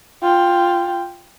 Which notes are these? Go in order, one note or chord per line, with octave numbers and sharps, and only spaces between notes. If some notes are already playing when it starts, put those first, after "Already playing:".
F4 G5